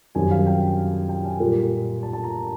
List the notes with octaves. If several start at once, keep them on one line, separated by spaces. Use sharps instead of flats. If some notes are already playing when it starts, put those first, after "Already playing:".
F#2 D#3 G3 C4 G#5
F5
G5
G5
G#5
A#2 G3 A#3
A5
A5
A#5